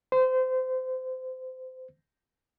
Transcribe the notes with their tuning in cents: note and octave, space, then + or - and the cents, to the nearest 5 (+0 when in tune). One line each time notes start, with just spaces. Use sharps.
C5 -25